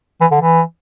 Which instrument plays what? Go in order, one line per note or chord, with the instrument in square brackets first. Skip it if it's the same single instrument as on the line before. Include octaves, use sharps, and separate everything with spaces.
[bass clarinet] E3
D3
E3